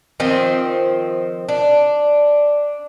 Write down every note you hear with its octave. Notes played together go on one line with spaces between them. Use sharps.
D#3 F3 C4
D4